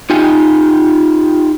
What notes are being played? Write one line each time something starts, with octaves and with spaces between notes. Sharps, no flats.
D#4 F4 G4 G#5